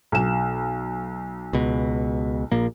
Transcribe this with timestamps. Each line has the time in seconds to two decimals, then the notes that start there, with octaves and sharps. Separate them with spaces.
0.12 B1 E7
1.53 C#2 B2
2.52 A#1 A#2 A#3